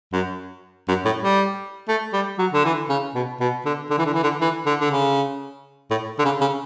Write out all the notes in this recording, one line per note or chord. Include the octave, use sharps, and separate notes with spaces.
F#2
F#2
A2
G3
A3
G3
F#3
D3
E3
C#3
B2
B2
D3
D3
E3
D3
E3
D3
E3
D3
D3
C#3
A2
D3
C#3
C#3